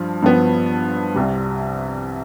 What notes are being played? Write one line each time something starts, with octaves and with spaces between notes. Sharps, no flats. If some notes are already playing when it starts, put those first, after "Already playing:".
Already playing: G2 F3
G2 F3 B3
C2 C3 G3